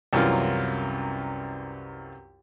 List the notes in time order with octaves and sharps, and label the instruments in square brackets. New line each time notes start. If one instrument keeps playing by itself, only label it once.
[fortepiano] C2 F#2 E3 C#4 F4 A#4